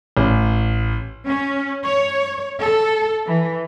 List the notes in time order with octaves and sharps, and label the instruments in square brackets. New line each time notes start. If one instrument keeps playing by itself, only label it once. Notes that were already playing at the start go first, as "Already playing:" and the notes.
[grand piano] A1
[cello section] C#4
C#5
A4
E3